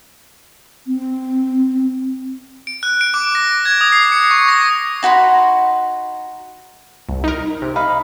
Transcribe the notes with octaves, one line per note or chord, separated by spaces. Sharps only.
C4
D7
F#6
D7
D6
A#6
G#6
D#6
C7
C#7
C#6
A#6
D#4 F#4 B5 C6
C2
D#4 A#4
C3
D#4 F5 B5